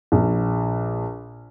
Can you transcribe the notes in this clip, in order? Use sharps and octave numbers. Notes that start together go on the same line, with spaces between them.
A#1